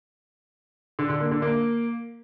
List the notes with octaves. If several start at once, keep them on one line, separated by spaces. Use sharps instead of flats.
D3
D3
A#3
D3
A#3